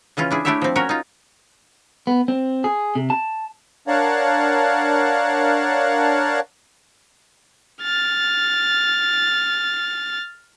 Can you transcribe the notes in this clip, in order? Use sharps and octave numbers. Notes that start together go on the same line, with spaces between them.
C#3 E3 C#4 F4
D4 E4 G#4
A3 D4 E4 G4 C#5 E5
F3 C4
C#4 F#4 A#4 C#5
D#4 F4
B3
C4
G#4
C3
A5
D4 A#4 C#5 F5 F#5 A5
F6 A6